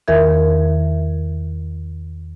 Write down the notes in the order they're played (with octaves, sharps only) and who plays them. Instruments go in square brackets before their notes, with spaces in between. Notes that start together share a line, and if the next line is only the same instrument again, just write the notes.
[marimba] E2 D#3 A#4 E5 G#6